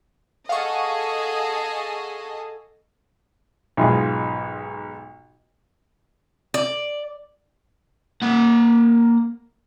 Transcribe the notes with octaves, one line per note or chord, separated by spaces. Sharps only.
G#4 A4 D#5 F5 F#5 C#6
B1 G#2 F4 G#4
D5
A#3 F#5